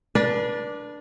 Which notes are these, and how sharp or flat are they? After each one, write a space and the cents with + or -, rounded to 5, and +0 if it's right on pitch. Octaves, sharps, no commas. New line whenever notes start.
D4 +0 B4 -40